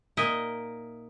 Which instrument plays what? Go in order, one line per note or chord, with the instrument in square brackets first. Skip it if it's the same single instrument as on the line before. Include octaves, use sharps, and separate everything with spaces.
[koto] A#2 D#4 A#4 D#5 E5